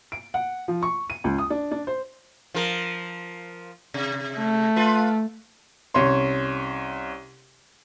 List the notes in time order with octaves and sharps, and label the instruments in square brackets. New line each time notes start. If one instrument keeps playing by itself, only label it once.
[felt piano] D7
F#5
F3
C#6
D#7
C#2
D#6
D4
D4
C5
[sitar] F3 A#4
C3
[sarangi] A3
[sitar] F4 B4
[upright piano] C2 C#4 C#5 C6